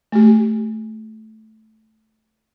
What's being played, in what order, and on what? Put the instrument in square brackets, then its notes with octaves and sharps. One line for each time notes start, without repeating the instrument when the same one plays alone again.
[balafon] A3 G4